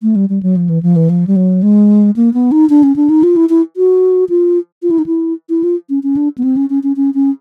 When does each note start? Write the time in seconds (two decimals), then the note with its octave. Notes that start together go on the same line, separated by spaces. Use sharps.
0.02 A3
0.16 G3
0.29 G3
0.43 F#3
0.56 F3
0.69 E3
0.83 F3
0.96 E3
1.10 F3
1.27 G3
1.36 F#3
1.63 G#3
2.16 A#3
2.34 B3
2.52 D#4
2.69 D4
2.83 C#4
2.96 D4
3.09 D#4
3.23 F4
3.36 E4
3.49 E4
3.77 F#4
4.29 F4
4.83 F4
4.91 E4
4.99 D#4
5.06 E4
5.49 E4
5.63 F4
5.90 C#4
6.03 C#4
6.16 D4
6.38 B3
6.43 C4
6.57 C#4
6.70 C#4
6.83 C#4
6.96 C#4
7.14 C#4